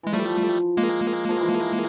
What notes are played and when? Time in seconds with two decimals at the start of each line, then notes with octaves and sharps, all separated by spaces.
0.03 E3 G#3
0.13 F3 G3 A3
0.77 G#3 A#3
1.29 F3
1.40 E3